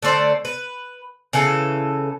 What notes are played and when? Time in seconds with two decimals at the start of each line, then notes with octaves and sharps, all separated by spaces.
0.02 D3 A3 C5 D5
0.45 B4
1.33 C#3 E3 A4